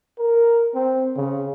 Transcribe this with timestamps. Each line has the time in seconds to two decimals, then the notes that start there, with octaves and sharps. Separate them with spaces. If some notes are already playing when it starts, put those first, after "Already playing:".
0.18 A#4
0.75 C4
1.16 C#3